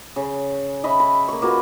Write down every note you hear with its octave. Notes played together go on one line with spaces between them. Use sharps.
C#3
D#5 E5 B5 C#6
B5
A#3 C#6
A#3 F4 F#4 B4